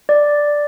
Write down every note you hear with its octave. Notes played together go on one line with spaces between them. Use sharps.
D5